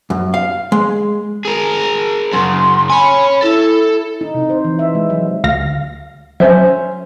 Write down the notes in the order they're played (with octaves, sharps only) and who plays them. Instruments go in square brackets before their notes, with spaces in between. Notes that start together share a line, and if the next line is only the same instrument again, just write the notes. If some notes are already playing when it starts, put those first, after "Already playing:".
[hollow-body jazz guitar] F#2
F5
G#3
[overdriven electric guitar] G#4 A#4
[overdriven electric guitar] F#2 C#3 [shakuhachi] C6
[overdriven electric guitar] C#5 G#5 [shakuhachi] B5
[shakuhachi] E4 [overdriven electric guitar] A4
[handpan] D#4
C3
C5
E3
E5
G#3
F#3
[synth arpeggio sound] D2 F5 A#6
[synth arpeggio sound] F#3 [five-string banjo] C#4 C5 E5